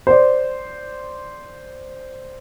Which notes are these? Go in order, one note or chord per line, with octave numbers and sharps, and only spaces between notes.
C5 D5